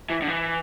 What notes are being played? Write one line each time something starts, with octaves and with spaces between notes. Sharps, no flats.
E3
D3
E3